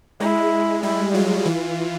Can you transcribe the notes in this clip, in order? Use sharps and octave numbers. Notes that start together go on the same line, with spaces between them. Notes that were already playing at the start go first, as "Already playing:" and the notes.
G#3 E4
G3 E4
F#3 F4
E3